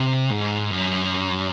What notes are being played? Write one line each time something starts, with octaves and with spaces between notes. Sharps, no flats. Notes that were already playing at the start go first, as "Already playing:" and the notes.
Already playing: C3
G#2
F#2